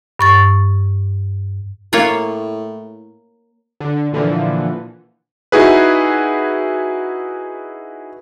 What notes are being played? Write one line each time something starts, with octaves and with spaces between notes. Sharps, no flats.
G2 C#6 A6
A2 A#3 F4 C#5
D3
A#2 D3 E3 F3
D#4 E4 F#4 G#4 B4